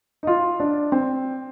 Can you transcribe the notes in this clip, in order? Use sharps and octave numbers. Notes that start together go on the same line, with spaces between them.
D#4
F4
D4
C4